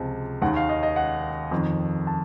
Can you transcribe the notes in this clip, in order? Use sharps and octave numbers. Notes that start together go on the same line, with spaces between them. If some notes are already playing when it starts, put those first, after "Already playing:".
Already playing: C#2 C3 F3 A5
D#2 D#3 F#5
F5
D#5
D#5
F#5
F2 D#3
A5